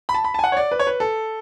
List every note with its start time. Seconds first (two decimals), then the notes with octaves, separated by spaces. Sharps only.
0.09 B5
0.14 A5
0.24 B5
0.34 G#5 A5
0.44 F#5
0.52 C#5
0.57 D5
0.71 B4
0.79 C#5
0.87 B4
1.00 A4